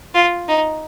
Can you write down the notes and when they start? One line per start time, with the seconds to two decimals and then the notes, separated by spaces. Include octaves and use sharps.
0.15 F4
0.48 D#4